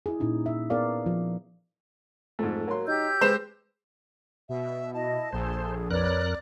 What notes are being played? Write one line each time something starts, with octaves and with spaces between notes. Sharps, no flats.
E4 G#4
A#2 C#4 D#4 E4
E5
B3 G#4 A#4 D5 F5
F3
F2 G#2 A3
F#3 A#3 C6
D#4 G4 E6 G6
G#3 B4 C5 E7
B2 E5
E4 D#5 A5
A#1 G#4 A4 C5
F2 A#4 B4 C#5 D5 F#6